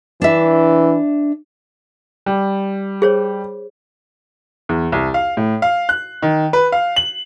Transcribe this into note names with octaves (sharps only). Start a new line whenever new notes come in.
E3 D4 E5
G3
G#4 C5 C#5
E2
C2
F5
A2
F5
F#6
D#3
B4
F5
F#7